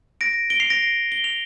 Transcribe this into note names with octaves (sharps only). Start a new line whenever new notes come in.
A#6 D7
D7 G7
C7 F7
A#6 D7
G7
F7